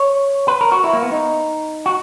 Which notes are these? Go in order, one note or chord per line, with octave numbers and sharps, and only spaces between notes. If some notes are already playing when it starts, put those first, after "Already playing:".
Already playing: C#5
B4
A#4
F#4
E4
A#3
B3
D#4
F#4